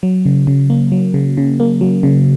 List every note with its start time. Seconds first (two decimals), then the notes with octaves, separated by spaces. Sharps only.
0.03 F#3
0.26 C#3
0.47 C#3
0.70 A#3
0.92 F#3
1.14 C#3
1.37 C#3
1.60 A#3
1.81 F#3
2.03 C#3